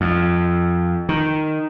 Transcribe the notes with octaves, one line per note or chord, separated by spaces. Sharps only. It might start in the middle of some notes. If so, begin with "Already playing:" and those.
F2
D#3